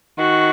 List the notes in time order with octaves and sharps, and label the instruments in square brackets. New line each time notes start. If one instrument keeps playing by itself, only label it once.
[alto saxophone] D#3 [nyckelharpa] F#4